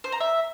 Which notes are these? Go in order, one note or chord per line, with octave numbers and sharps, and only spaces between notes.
C5
A#5
E5